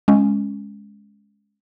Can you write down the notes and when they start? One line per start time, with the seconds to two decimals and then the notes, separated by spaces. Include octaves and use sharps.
0.08 G#3 C#4